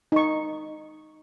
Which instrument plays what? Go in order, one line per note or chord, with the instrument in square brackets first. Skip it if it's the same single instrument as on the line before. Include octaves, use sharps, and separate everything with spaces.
[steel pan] D#4 C#6